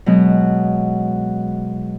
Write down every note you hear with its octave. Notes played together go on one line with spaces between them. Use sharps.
B2 F#3 G#3